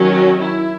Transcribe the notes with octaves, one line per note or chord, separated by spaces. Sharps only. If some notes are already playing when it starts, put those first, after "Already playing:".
Already playing: D#3 F#3 C#4
F#4
E4